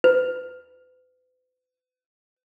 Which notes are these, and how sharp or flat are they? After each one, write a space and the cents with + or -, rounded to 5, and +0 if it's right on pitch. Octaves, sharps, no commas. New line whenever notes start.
B4 +40